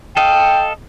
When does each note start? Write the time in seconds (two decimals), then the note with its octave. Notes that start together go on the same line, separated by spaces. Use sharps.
0.17 A4 D#5 F5 G5